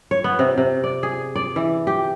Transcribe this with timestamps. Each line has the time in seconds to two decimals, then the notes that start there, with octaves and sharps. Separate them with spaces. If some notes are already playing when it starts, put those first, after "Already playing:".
0.11 C#5
0.24 B3
0.39 C3
0.58 C3
0.84 D5
1.03 G#4
1.36 D5
1.56 E3
1.87 G4